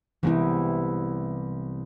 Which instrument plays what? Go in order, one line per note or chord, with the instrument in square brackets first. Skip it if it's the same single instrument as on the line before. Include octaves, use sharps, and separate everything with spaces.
[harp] C2 G#3 G4 [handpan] E3 B3 E4